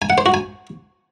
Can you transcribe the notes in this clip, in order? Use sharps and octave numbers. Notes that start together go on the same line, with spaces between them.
G#5
F#5
C5
F#4
G#5